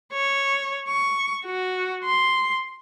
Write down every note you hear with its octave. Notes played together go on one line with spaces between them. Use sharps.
C#5
C#6
F#4
C6